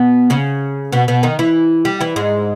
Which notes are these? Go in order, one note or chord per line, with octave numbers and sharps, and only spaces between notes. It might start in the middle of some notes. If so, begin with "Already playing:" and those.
Already playing: B2 B3
C#3 C#4
B2 B3
B2 B3
D#3 D#4
E3 E4
G3 G4
E3 E4
G#2 G#3